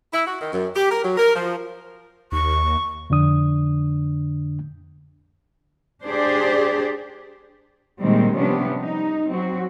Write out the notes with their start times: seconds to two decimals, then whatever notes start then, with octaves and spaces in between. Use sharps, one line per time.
0.13 E4
0.27 F#4
0.41 D#3
0.53 F#2
0.76 G4
0.91 A#4
1.04 F#3
1.17 A#4
1.35 F3
2.32 D#2 C#6
3.10 F2 D3 D4 D#6
6.04 D4 G4 G#4 C5 D5
8.01 A#2 D#3 G3 G#3 A#3 C4
8.34 C3 F3 G3 B3 C#4 D4
8.81 D#4
9.30 F#3 C4 F#4